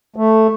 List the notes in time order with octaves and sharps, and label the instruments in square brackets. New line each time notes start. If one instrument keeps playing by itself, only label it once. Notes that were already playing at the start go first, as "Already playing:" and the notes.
[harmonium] A3